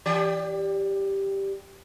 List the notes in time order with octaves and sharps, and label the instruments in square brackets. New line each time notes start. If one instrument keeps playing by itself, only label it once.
[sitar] E3 G4 D5